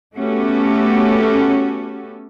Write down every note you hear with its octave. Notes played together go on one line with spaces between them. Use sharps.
A3 B3 C#4 F#4 G4 A4